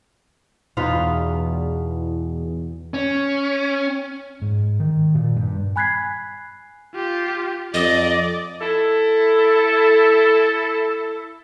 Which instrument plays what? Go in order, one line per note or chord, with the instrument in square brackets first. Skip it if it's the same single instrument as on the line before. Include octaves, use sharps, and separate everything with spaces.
[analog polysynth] E2 [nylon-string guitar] B2 [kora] D#4 F4 B4
[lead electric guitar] C#4
[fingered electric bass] G#2
D#3
A#2
G2
[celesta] G#5 B5 F#6 G#6 B6 C7
[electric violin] F4 G4
[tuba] F2 [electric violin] D5 [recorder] D#5
[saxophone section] E4 A4